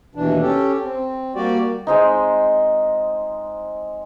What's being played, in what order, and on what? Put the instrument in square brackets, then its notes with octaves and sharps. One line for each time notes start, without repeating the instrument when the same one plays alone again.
[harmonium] D#2 B2 E3 D4
C#4 G4 A4
C4
G3 A#3 F#4 G4 D5
[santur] G#3 C4 D#4